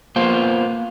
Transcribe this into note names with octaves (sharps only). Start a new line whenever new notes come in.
A#3 B3 F4 C5